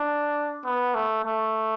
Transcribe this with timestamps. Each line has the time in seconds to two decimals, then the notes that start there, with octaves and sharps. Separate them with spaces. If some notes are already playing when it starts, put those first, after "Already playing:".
Already playing: D4
0.65 B3
0.95 A3
1.24 A3